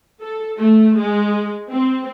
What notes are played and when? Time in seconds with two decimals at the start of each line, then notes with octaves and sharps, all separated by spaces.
0.22 A4
0.58 A3
0.98 G#3
1.71 C4